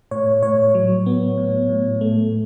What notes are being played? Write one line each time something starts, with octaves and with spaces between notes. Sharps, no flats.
A2 C#5
A2 C#5
F#3
B3
A2
A2
A3